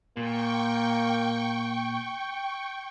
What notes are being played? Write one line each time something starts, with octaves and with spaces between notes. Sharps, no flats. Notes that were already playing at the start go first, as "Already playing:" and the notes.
A#2 A#3 G5 C#6